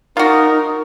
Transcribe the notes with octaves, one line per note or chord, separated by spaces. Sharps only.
D#4 F4 F#4 A#4